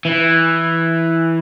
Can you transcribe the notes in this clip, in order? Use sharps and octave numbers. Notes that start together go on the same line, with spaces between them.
E3